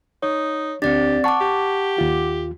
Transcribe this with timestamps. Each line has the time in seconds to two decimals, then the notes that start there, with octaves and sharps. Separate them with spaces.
0.22 D#4 C#5
0.82 D2 C4 D4 G4 D5 A6
1.24 F#5 A5 C#6 D6
1.41 G4
1.98 D#2 F4